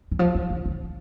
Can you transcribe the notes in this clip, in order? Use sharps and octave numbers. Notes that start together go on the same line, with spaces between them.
E3
F3
E3
D3
D3